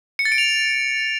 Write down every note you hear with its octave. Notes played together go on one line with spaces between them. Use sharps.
C#7
A6
D7
F7